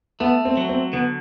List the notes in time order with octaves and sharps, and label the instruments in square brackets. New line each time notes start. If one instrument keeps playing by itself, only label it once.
[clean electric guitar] A3 [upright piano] B3
[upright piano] C4
[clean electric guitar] F#3
[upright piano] C4
[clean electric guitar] D3 [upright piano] B3